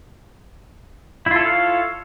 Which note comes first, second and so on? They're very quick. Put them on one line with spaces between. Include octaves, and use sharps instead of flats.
E4 F4 A4 C#5 F5